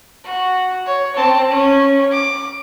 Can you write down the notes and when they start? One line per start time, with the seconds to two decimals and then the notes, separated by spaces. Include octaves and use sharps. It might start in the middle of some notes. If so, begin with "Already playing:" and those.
0.24 F#4
0.86 C#5
1.16 C4 A5
1.50 C#4
2.11 D6